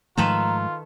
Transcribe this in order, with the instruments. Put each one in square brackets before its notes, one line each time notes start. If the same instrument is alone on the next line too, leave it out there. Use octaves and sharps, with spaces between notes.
[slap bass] G#2 F3 A3 [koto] D#3 A4 B4 [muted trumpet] F4 [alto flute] A#5